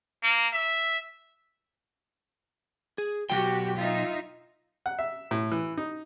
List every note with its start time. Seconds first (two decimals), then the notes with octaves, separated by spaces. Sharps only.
0.23 A#3
0.53 E5
2.98 G#4
3.30 B1 E3 F#4 G4 G5
3.78 D#4 F4 E5
4.86 F#5
4.99 E5
5.31 A2
5.52 E3
5.77 D#4